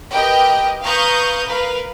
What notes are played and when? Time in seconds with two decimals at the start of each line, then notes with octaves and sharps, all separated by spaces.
0.13 G4 A#4 B4 D#5 G5
0.85 B4 F5 A#5 C#6 D#6 G6
1.47 A#4 B4 F5